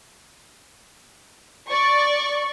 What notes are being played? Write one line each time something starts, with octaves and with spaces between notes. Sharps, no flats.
D5 C#6